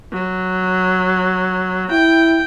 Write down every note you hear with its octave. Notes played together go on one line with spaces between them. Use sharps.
F#3
E4 G5